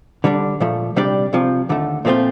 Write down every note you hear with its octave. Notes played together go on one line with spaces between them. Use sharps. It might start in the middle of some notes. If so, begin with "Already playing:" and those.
D3 G3 D4
A#2 F3 A3
C3 G3 D4 G4 D5
C2 C3 F3
D#2 D3 A3
A#2 F3 A3 C4 F4